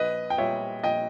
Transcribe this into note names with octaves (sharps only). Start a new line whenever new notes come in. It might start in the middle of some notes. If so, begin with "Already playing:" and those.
Already playing: A#1 B4 D#5
G5
A#2 G3 C#5 E5
A#1 D#5 G5